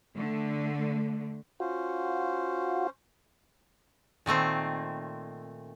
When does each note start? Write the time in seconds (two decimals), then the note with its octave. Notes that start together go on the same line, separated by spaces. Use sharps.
0.16 D3 A3
1.60 C#4 F4 F#4 C5
4.26 A#2 D#3 A3 C4